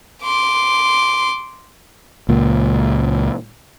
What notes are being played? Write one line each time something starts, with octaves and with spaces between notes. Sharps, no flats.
C6 D6
C#2 A#2